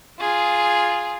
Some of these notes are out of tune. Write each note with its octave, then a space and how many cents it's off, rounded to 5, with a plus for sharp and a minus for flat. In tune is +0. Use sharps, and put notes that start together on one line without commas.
F4 +0 G#4 +0